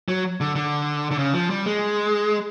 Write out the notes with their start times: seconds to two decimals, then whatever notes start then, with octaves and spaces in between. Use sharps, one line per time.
0.08 F#3
0.41 D3
0.56 D3
1.11 D3
1.18 C#3
1.34 F3
1.50 G3
1.66 G#3